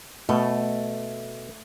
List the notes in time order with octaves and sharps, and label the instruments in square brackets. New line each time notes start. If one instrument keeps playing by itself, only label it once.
[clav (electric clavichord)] B2 [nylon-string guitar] A3